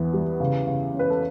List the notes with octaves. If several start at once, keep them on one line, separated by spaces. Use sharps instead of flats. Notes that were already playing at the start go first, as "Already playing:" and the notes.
Already playing: E2 B3
G3
C#3
C#3
C#4
B4
A4